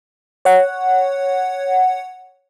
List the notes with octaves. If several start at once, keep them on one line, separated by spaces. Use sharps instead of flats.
C#5 F#5